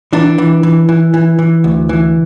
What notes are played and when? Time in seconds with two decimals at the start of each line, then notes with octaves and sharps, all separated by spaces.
0.13 E3 D4
0.38 E3
0.63 E3
0.89 E3
1.14 E3
1.39 E3
1.64 D2
1.89 E3